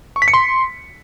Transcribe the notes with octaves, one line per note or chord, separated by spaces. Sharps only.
C#6
B6
C#7
C6